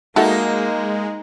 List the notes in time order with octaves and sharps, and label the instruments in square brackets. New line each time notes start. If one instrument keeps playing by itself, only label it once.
[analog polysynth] G#3 [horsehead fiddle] A#3 [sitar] D#4 [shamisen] F#4 A4 E5